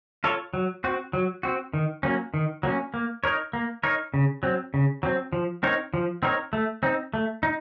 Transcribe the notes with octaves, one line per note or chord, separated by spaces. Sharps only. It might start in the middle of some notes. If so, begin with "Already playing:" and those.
F4 A4 C#5
F#3
C4 F#4
F#3
C4 F#4
D#3
F#3 A#3 C#4
D#3
F#3 A#3 C#4
A#3
D#4 A#4 C#5
A#3
D#4 A#4 C#5
C#3
F#3 C4
C#3
F#3 C4
F3
C4 D#4 A#4 C#5
F3
C4 D#4 A#4 C#5
A3
C4 D#4
A3
D#4